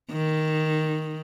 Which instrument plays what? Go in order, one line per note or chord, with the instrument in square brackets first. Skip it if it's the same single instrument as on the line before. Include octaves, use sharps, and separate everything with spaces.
[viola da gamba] D#3